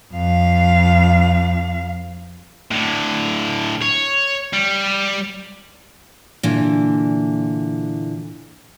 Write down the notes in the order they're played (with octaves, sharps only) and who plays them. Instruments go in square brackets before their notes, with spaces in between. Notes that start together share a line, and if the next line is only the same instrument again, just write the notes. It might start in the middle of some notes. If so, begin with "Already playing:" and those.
[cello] F2 F5
[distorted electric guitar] A2 D3
C#5
G3
[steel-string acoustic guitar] A#2 D3 E3